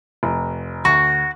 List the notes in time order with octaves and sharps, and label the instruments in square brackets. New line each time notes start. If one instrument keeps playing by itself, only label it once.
[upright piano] F1
[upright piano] D2 C#6 [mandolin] F#4